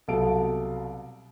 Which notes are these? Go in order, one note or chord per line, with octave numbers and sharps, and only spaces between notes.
C2 B2 F#3 A4 F5 D7